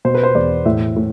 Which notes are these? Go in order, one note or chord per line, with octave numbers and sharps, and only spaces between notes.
B2 C5
B4
C5
E2 D5
A2 E5
A2